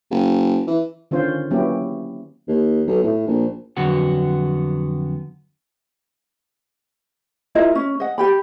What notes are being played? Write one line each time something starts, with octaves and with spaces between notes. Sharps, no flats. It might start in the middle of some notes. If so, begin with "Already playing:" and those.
F#1
E3
D3 D#3 C#4 F4 C5
F#3 A#3 B3 C#4 E4 G4
D#2
B1
A2
A#1
F2 D3 F#3 B3 F#4
E4 F4 A#4 D#5
C#4
D#5 F#5
G4 G5 B5